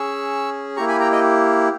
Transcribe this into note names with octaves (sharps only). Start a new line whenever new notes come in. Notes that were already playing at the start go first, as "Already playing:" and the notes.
Already playing: C#4 G#4 C#6 E6
A#3 E4 G4 A#5 C#6
G#5 B5
G5 A#5
D#5 G5